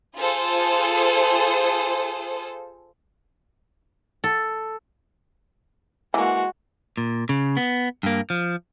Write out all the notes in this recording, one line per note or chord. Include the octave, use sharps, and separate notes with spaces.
F4 G#4 A4 C5
A4
E3 G#3 A#3 F#4
A#2
C#3
B3
G2 A#3
F3